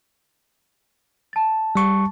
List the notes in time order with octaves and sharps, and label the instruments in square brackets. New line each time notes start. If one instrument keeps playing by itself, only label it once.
[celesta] A5 A6
[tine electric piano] G3 C#6